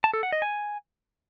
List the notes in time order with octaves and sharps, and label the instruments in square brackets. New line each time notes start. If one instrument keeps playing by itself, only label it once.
[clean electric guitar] A5
A4
F#5
D#5
G#5